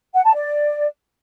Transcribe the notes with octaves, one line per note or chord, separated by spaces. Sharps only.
F#5
A5
D5